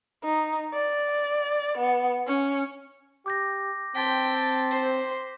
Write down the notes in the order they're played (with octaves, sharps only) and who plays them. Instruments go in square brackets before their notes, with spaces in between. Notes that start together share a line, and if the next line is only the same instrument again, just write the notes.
[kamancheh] D#4
D5
B3
C#4
[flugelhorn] G4 [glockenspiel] D6 G6 A#6
[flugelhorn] C4 [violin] G5 [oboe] A5 [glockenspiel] C6 G6 B6
[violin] C5